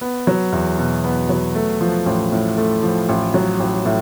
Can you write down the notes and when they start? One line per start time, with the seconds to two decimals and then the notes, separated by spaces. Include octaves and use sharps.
0.01 B3
0.27 F#3
0.53 E2
0.79 B2
1.04 B3
1.29 F#3
1.55 A3
1.81 F3
2.06 A1
2.32 A2
2.57 A3
2.83 F3
3.09 A1
3.34 F#3
3.60 A1
3.86 A2